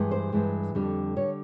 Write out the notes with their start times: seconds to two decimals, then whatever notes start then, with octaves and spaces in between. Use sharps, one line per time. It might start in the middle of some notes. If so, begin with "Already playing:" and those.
Already playing: G2 E3 G#3
0.11 C5
0.32 G2 E3 G#3
0.75 F2 D3 G3
1.16 D3 G3 C#5